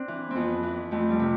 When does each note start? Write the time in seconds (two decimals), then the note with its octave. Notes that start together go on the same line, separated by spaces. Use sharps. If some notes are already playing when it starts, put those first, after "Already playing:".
Already playing: C4 D4
0.08 E3
0.31 C4
0.36 F2 B3
0.63 E3
0.91 F2 A3
1.10 G3
1.20 C3